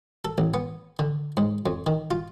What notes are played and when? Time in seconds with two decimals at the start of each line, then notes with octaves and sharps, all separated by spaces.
0.25 A4
0.38 A1
0.54 B3
0.99 D3
1.37 G#2
1.66 F2
1.87 D#3
2.11 F4